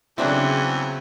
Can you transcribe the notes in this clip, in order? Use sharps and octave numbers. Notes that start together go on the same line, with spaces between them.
E2 C#3 F#3 C4 D4 E4 F#4